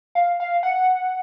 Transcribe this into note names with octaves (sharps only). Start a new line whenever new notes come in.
F5
F5
F#5